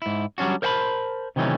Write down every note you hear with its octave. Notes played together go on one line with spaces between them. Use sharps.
G#2 E4
F#3 G3 C#4 D4 F#4
A#4 C5 D#5 F#5 A5 B5
C3 D#3 E3 F#3 A3 C#4